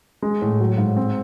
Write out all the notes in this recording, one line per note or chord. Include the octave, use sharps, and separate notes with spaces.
G#3
A2
F#3
G#2
C4